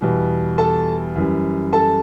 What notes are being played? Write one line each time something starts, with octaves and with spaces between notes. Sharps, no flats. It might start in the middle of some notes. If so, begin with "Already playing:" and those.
E2 B2 G3
A4 A5
F#2 E3 G3
A4 A5